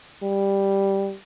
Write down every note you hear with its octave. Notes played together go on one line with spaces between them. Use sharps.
G3